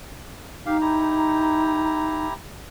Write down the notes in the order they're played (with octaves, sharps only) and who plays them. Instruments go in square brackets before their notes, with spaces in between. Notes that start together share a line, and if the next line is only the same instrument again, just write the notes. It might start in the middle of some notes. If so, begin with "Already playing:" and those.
[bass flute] D#4 [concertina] G4 F5
[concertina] E4 G4 A#5